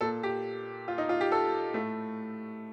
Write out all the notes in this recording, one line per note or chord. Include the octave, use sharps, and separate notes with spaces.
A#2 A4
G4
F4
D#4
F4
G4
A4
A2 A3